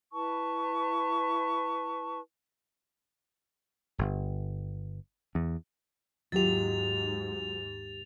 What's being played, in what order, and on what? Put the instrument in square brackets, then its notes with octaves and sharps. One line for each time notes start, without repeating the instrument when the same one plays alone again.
[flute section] E4 B4 A5 C#6
[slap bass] G1
E2
[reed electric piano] D#2 G4 [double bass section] G#2 [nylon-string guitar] F#3 D#4 F4 [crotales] A6 F7